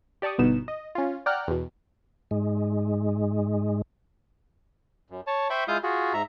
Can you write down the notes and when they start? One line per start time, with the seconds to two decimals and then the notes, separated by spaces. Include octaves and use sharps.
0.22 G4 D5 A5 C#6 D#6
0.38 G1 B2 B3 D#4 E7
0.68 D#5
0.95 C#4 F4
1.26 D5 F#5 G5 A#5 F6 F#6
1.48 E2 B2
2.31 G#2 G#3
5.10 F#2
5.27 C#5 A5
5.50 C5 E5 G5 B5 C#6
5.68 G#3 E4 F4 F5 D#6 G6
5.83 F4 F#4 G#4
6.13 G#2 E5 A#5